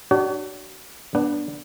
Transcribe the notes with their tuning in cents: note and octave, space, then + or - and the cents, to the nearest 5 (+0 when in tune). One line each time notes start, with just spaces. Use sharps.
D4 +30 F#4 +35 C#5 +45
B3 -25 D4 +0 F#5 +20